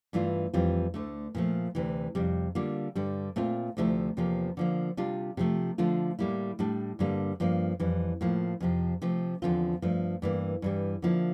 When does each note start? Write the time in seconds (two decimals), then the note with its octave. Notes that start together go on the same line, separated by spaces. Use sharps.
0.13 G2 E3 A3 D4 F4
0.54 F2 E3 G3 C4 F4
0.94 D2 D3 A3
1.35 A#2 F3 A3
1.75 D2 C3 E3
2.15 F2 C3 G3
2.55 D3 G3 A#3 F4
2.95 G2 D3 G3
3.36 A#2 A3 C4 F4
3.77 D2 C3 F3 A3 E4
4.17 E2 C3 F3 A#3
4.57 D3 F3 A#3
4.97 C3 G3 D4 F4
5.37 C3 F3 A3
5.78 D3 F3 A3 D4 F4
6.19 A2 G3 A#3 E4
6.59 A2 G3 D4
6.99 G2 D3 G3 A#3
7.40 G2 F3 A#3
7.80 F2 E3 G3
8.21 A2 F3 A#3
8.60 F2 C3 F3
9.02 C3 F3 A3
9.42 E2 D3 F3 C4 F4
9.82 G2 F3 A3
10.22 G2 E3 A#3
10.62 G2 E3 G3
11.02 D3 F3 A#3 E4